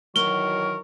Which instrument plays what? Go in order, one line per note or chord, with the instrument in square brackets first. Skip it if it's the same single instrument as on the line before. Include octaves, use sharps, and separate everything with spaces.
[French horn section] D#3 E3 F#3 [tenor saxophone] A#4 [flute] C#6 [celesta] G7